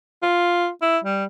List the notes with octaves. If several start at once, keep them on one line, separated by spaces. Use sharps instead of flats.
F4
E4
G3